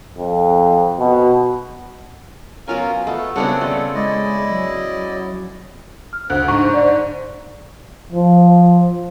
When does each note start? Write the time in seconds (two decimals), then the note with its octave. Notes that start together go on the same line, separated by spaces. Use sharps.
0.18 F2
0.99 B2
2.68 F#3 B3 C#4 F4 A#4 F5 G#5
3.07 A3 B3
3.36 C#3 G3 B3 C4 D4 F#5
3.61 A3 F4 D5
3.95 G#3 E4 D5 D#5
4.49 F#3
6.13 F6
6.30 D2 C5 F#6
6.48 G#2 D3 C#6
6.74 D5
8.13 F3